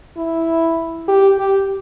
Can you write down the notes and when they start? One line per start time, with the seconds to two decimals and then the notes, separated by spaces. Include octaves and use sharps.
0.17 E4
1.08 G4
1.38 G4